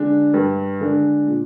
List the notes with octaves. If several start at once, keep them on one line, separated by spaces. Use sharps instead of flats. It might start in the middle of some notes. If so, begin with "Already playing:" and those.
Already playing: D3 G#3 D4
G2
D3 G#3 D4
A#2